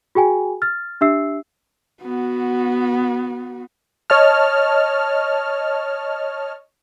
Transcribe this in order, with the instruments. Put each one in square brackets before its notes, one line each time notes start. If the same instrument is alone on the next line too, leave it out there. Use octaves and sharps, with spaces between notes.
[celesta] F#4 G#4 G5 G#5
F6 A6
D4 G4 E5 E6 C7
[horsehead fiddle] B3 F#4
[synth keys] C#5 D#5 A5 F6